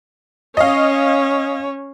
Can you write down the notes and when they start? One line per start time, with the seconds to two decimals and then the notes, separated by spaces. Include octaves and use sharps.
0.57 C#4 C#5 D#5 F5